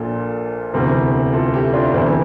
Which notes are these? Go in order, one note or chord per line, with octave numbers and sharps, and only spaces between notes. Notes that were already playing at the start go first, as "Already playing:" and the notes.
Already playing: A#1 A#2 F4 A4
E1 D2 C3 E3
F4 A4
E4 G4
D4 F4
E1 D2 C3 E3 C4 E4